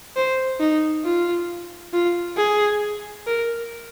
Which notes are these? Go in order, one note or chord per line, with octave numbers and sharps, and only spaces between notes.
C5
D#4
F4
F4
G#4
A#4